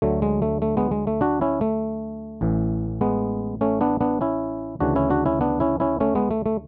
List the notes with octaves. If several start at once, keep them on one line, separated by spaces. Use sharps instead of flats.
D2 D3 F#3 A3
G#3
A3
A3
G#3 B3
G#3
A3
D4 F#4
C#4 E4
A3
A1 A2 E3
G#3 B3
A3 C#4
B3 D4
B3 D4
C#4 E4
D2 C#3 E3 D4 F#4
C#4 E4
D4 F#4
C#4 E4
B3 D4
C#4 E4
C#4 E4
A3 C#4
G#3 B3
A3
A3